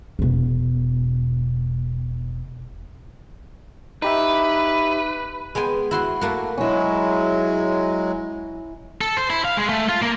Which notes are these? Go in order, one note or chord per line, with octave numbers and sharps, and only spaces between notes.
E1 B2
D#4 G4 B4 E5
G#3 B3 G5 G#5
E4 F#4 C6
A3 A#3 F#4
F#3 G#3 C#4 E4
A4
C5
E4
F5
G#3
A3
F4
A#3